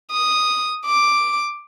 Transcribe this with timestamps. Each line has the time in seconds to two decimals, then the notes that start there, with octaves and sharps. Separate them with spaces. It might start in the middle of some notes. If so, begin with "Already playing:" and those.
0.11 D#6
0.85 D6